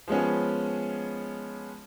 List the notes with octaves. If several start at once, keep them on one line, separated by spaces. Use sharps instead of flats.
F3 G#3 B3 C#4